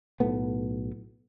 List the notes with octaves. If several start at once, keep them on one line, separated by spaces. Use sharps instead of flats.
B1 A2 A3 B3